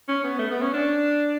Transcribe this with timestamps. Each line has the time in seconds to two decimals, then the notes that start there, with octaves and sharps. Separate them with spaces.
0.08 C#4
0.24 B3
0.39 A3
0.51 B3
0.62 C#4
0.74 D4